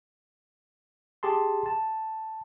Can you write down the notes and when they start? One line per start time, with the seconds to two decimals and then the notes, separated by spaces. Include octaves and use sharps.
1.23 G4 G#4 A5 C6
1.66 A5